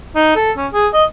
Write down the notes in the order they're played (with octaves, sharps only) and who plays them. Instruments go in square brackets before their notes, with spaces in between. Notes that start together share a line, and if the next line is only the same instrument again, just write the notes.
[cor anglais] D#4
A4
C#4
G#4
D#5